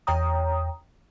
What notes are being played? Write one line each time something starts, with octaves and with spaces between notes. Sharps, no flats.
E2 C#5 G5 A#5 D#6